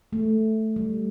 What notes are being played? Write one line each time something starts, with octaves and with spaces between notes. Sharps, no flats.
A3
G3